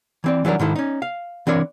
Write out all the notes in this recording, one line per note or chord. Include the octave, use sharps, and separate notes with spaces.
E3 C4 D5
E3 F#3 G3 D4 A#4
G#2 D#3 E4 A4
C#4 D#4
F5
E3 C4 D4 A#4 C#5